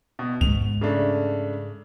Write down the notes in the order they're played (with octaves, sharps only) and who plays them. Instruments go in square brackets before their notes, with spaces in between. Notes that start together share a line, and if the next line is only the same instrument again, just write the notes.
[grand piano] B2
[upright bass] G#2 G#3 [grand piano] F7
[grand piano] C#3 A3 D4